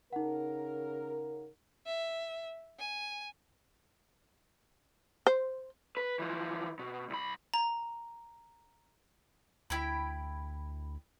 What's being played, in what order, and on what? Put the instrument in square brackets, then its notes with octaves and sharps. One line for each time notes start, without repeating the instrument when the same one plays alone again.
[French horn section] C#3 A#4 [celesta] D#4 F#5
[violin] E5
G#5
[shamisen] C5
[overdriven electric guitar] B4
E3 F3
B2
C2 B5
[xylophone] A#5
[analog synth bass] D2 [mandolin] E4 G5 B5